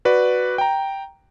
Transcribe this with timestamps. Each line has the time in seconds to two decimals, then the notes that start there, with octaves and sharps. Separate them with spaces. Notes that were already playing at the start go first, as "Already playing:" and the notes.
0.05 F#4 B4 D5
0.58 G5 A#5